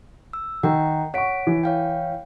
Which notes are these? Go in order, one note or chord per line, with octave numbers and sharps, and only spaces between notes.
E6
D#3 F#5 G5 A#5
C#5 F#5 C#6 B6 D7
E3
C#5 F5 G5